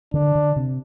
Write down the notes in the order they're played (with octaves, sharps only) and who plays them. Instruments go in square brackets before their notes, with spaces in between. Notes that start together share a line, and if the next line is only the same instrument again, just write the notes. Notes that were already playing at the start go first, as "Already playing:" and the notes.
[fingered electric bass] D3 [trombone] D4
[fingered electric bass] D3
C3